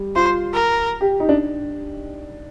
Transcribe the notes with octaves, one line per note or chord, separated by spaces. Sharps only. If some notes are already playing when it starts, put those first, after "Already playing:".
Already playing: G3
F4 C5
A#4
G4
D#4
D4